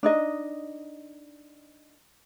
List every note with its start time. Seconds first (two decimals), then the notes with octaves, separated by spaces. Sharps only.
0.03 D4 D#4 D#5